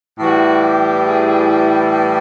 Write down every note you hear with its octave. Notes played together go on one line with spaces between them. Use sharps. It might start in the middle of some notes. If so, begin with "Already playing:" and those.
A2 E3 G3 F#4
G4
G#4
E4